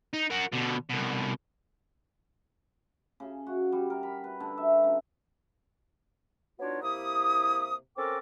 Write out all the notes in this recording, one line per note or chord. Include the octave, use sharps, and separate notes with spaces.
D#4
F#4 A#4
B2 D3
C2 B2
C#3
F#4
G3
A#4
B5
B4
D3
E5
C#3
B3 D4 D#4 F4 F#4 C#5
C3 A#3 E4 G4 D#6
C4 C#4 A4 A#4 G5 D6